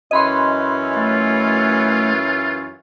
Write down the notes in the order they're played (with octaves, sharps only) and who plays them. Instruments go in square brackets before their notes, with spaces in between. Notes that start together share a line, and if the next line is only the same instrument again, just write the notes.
[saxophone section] F#2 E3 C#4 [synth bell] D#5 B5 C6
[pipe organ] A3 [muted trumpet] F4